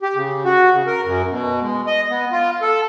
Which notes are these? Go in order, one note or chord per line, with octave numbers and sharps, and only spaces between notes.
G4
C#3
F#4
C#3
A#4
F#2
B2
G#3
D#5
B3
F4
A4